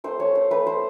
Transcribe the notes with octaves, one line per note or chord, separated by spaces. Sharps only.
A3 C5
A3 C#5
A3 C5
A3 B4
A3 C5